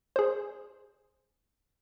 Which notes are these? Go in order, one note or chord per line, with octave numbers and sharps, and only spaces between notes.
G#4 C5